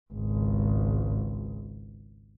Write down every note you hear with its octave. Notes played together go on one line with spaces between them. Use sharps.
G#1 C#2